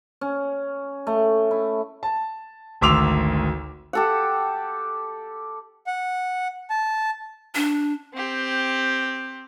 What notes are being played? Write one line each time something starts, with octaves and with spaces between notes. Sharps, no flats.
C#4
A3
E4
A5
G#1 D2 C6 D6 E6 F7
G4 A4 F#5
F#5
A5
D4
C4 G4